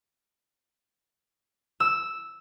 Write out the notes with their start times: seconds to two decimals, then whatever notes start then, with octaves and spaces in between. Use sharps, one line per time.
1.80 E6